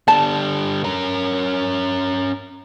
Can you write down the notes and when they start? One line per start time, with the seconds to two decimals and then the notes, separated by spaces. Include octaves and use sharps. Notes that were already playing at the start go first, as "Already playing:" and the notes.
0.08 D3 G3 A5
0.84 C#4 A#4